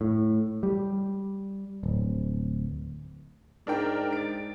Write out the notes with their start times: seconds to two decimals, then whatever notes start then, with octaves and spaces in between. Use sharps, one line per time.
0.01 A2
0.63 G3
1.83 D1
3.67 G#2 D4 A#4 G5
4.13 A6 D7